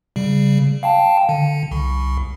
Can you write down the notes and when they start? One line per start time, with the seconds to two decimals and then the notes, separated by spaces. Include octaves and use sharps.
0.16 C#3 G3
0.83 F5 G5 A5
1.29 D3
1.71 C2